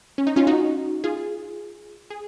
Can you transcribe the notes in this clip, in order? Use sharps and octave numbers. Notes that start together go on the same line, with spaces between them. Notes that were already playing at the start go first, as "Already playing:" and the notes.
C#4
D#4
C#4 F4
D#4 F#4
F4 G#4
G#4